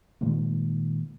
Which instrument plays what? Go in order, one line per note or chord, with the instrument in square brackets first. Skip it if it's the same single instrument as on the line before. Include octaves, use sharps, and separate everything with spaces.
[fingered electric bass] A#2 D#3 G#3 A#3